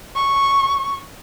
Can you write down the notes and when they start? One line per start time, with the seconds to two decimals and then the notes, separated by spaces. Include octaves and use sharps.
0.16 C#6